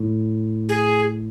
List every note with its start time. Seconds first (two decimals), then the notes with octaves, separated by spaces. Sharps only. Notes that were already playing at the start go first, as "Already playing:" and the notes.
Already playing: A2
0.69 G#4